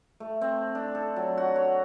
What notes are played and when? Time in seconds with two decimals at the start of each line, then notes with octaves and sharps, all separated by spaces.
0.20 A3
0.41 C4
0.75 D4
0.95 A4
1.16 F#3
1.37 F#4
1.56 C#5